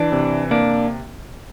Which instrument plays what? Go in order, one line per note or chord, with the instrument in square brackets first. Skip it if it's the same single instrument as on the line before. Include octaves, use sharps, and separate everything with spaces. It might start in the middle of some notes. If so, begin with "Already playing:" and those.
Already playing: [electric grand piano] E3 [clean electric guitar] D4
[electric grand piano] C3
[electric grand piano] A#3 [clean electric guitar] D4